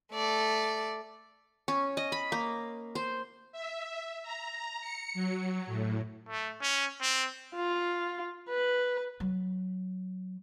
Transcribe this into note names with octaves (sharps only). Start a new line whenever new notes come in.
A3 D5
C#4
D#5
B5
A#3
C5
E5
A#5
C#7
F#3
A2
A3
C#4
C4
F4
B4
F#3